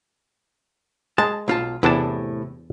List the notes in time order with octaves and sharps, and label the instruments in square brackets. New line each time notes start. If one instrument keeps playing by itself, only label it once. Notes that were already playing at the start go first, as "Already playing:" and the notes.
[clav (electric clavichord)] G#3 [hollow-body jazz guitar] A5
[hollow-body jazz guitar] B1 F4 A5
[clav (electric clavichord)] E2 D4 A5 [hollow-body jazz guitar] A2 C3 E4